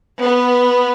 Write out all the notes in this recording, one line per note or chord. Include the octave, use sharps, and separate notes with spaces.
B3